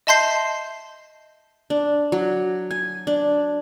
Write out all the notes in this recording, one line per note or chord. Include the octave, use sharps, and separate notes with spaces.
D#5 E5 A5 C6 G6 C7
D4
F#3
G#5
D4